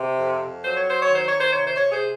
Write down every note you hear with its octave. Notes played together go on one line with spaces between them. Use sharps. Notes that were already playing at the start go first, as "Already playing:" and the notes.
Already playing: C3
F2
F#3 C5
C#5
C5
C#5
D#3 C5
C#5
C5
C3 C#5
C5
C#5
G#4 C5